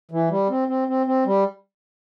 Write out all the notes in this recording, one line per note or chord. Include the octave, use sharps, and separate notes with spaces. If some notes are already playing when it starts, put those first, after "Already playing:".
E3
G3
C4
C4
C4
C4
G3